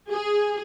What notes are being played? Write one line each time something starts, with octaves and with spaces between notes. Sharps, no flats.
G#4